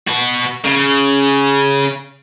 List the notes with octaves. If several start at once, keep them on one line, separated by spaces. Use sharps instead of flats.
F#4 B4
C#3